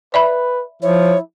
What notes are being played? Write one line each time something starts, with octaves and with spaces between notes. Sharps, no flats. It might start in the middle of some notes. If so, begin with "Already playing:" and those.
B4 D5 E5 B5
F3 E4 C#5